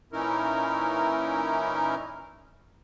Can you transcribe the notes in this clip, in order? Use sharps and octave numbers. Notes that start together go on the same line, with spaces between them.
A#2 E3 C#4 D#4 E4 A#4